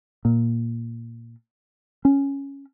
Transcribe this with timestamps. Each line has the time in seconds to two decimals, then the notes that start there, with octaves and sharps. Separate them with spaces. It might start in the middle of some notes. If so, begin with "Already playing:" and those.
0.25 A#2
2.05 C#4